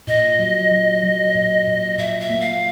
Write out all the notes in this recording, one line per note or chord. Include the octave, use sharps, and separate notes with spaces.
A#2 D#5
F#3
F#3
F#3
A#2
A#2
A#2 E5
E5
A#3
F5